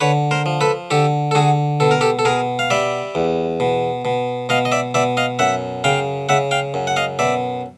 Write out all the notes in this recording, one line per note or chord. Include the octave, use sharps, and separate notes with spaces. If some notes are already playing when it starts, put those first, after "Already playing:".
D3 B4 C#5
A#4 C5
F3
A4 B4
D3 G4 A4
A4
D3 F#4 G#4
B2 A4
A#4
G4 A4
A4
B2 G#4 A#4
F5
G3 D5 E5
E2
B2
B2
B2 D#5 F5
D#5
D5 E5
B2 D5 E5
D#5 F5
F#2 E5 F#5
C#3 F5 G5
C#3 E5 F#5
F5 G5
F#2
F#5
D#5 F5
B2 D5 E5